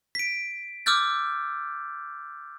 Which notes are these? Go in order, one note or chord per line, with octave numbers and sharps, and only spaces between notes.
B6 D7
D6 E6 F6 G6 A6